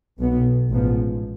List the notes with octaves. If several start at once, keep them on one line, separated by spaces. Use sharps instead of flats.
B1 B2 B3
A1 G#2 F3 B3